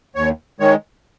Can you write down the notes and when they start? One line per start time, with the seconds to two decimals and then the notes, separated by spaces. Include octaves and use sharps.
0.15 D#2 C#5
0.60 D#3 G#3 C#5